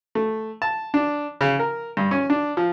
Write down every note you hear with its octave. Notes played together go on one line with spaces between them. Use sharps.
A3
A5
D4
C#3
A#4
G2
C#4
D4
F3